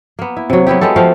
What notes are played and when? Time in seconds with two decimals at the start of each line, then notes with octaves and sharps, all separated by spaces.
0.19 A#3 B3
0.37 E4
0.50 C3 F#3
0.67 F#3 B3 E4 G4
0.81 G#3 B3 G4 A4
0.96 F3 A3 F5 G5